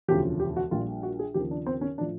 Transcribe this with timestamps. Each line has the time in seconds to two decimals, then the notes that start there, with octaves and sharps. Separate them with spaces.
0.08 E1 D2 C#3 F3 G4
0.40 G4
0.56 F#4
0.71 A#1 A#2 G3 F4
1.03 F#4
1.19 G#4
1.34 D#2 C#3 F3 G4
1.51 D4
1.67 C4
1.81 C#4
1.98 A2 F3 D4